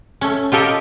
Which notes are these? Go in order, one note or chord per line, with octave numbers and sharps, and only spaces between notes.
A3 C#4
F4 G4 A4 A#4 D#5